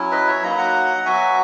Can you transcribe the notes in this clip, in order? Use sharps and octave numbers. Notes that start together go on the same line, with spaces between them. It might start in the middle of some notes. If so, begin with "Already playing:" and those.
Already playing: F#3 C#4 E4
B4 D#5
C#5 E5
F#3 A#3 D#4 A#5
B5
F#5 A#5
F#3 B3 F#4 E5 G#5